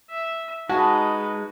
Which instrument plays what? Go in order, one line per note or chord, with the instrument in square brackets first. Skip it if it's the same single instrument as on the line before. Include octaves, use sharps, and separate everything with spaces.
[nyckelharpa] E5
[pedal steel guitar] G#3 [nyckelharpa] D#4 B4 [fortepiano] F#4 [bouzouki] F#5 G#5 A5